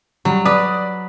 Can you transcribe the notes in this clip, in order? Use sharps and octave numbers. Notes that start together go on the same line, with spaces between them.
F#3 G3
B4 D5 D6 D#6